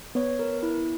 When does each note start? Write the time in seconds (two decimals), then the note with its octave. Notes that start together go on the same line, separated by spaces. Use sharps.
0.15 B3 C#5
0.39 A#4
0.63 E4